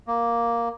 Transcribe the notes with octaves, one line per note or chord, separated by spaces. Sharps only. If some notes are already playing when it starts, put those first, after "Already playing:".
A#3